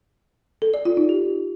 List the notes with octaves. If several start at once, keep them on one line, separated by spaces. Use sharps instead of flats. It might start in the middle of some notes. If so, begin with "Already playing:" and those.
A4
D5
F4
D#4
G4